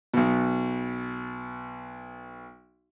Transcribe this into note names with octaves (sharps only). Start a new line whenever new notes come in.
B1 B2